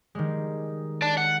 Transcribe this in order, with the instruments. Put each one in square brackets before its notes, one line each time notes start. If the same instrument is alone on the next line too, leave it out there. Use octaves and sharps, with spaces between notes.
[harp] D#3 G3 G#3
[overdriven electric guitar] D5 A5
F#5